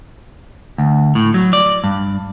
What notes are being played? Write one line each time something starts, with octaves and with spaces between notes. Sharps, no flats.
D2
A2
F#3
D5
G2